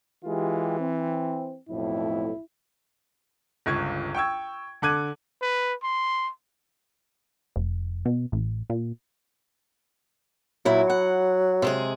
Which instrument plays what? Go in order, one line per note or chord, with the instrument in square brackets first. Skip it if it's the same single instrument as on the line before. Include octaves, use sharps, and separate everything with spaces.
[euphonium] E3 [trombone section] G#3 F4 G4
[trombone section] C4
[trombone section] B1 F2 A2 [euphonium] E4
[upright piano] G1 C#2 C#6 G#6
G5 C#6 E6 G#6
D3 A4 D6 F#6 G#6 D#7
[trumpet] B4
C6
[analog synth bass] F1
B2
A1
A#2
[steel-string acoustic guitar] A#2 E4 [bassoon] F#3
[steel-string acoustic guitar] F#5
C3 G#3 G#4